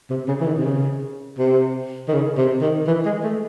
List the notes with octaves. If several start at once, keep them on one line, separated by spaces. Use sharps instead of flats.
C3
C#3
E3
D#3
C3
C#3
C3
D#3
C#3
C3
D#3
E3
G#3
A3